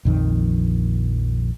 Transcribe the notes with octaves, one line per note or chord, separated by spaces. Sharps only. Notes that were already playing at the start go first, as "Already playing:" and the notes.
A#1 F2 D#3